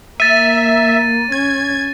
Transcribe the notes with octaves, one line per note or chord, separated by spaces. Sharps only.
A#3 E5 A6 D#7
C#4 G#6